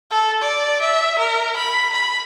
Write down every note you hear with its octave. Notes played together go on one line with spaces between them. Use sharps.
A4
D5
E5
A#4
B5
B5